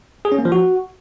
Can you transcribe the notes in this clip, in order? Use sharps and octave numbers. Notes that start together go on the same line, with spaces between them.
G#4
C#4
A#3
F3
F#4